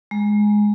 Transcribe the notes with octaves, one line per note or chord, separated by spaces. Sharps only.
G#3